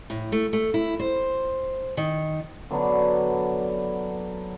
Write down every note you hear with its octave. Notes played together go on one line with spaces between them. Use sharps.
A2
A3
A3
E4
C5
D#3
D3 F#3 B3 D4